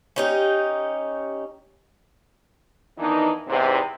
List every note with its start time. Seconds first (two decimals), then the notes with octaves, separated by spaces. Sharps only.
0.16 C#4 D#4 G4
2.99 D#3 E3 B3 D4 D#4
3.48 E2 G#2 C3